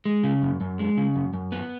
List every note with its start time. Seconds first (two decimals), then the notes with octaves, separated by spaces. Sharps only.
0.05 G#3
0.24 C#3
0.42 F#2
0.61 F#2
0.79 G#3
0.97 C#3
1.16 F#2
1.34 F#2
1.52 B3